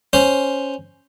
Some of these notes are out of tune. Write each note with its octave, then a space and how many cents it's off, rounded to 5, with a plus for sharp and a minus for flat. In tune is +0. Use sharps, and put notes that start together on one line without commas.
C#4 +0 C5 +0